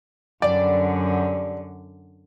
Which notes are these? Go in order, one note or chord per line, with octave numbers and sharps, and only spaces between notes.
F#2 D3 G3 D4 D5